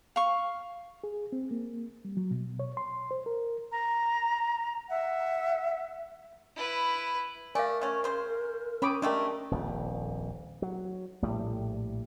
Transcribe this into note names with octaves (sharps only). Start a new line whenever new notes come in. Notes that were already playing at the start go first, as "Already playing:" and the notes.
F5 C#6
G#4
C4
A#3
G3
F#3
B2
C#5
C6
C5
A#4
A#5
E5 F#5
E4 B4
A3 A#4 D5 F5 G#5
A3 C#4
C#3 C5
C4 C#4 C#5 B5 D6 D#6
G#3 A3 D4 G4 A#4
D#1 A#1 F2
F#3
A#1 A2 G3